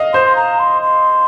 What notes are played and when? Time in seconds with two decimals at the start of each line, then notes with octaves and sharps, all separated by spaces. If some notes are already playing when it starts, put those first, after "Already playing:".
Already playing: D#5 F5
0.13 C5 C6
0.26 C6
0.36 A#5
0.59 C6
0.82 C6